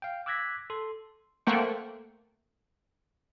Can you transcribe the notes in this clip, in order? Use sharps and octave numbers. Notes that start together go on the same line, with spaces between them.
F5 G5
D6 E6 F#6 G#6 A#6 B6
A4 C6
A3 A#3 C5 F#5 G5 C#6